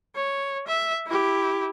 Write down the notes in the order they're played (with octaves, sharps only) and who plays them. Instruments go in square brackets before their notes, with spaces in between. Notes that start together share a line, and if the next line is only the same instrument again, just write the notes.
[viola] C#5
E5
E4 G4